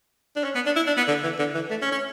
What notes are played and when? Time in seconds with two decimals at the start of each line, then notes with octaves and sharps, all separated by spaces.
0.36 D4
0.44 C#4
0.55 B3
0.66 D4
0.76 E4
0.87 D4
0.97 B3
1.08 D3
1.24 E3
1.39 D3
1.55 E3
1.70 A3
1.82 C#4
1.92 C#4